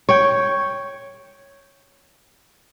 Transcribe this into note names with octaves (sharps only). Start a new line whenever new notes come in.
C#5 G5